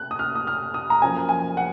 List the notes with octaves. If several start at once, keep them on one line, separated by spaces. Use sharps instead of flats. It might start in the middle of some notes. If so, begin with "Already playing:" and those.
Already playing: A#3 F#6
D#6
F6
D#6
F6
D#6
A#5
F#2 F3 A#3 G#5
G#5
F#5